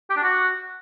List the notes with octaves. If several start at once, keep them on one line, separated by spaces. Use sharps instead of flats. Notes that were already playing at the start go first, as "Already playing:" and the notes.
G4
D4
F#4